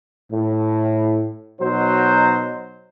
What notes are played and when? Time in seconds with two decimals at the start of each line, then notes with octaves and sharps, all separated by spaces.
0.31 A2
1.61 B2 F#3 D#4 C5